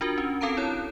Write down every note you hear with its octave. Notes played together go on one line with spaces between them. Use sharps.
D4 F4 F#4 A#4
C#4
C4 A4 F5 A5 A#5 D7
E4 C#5 F#6